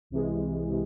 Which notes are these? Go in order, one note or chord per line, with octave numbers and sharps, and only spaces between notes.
C2 C3 E3 G#3
C3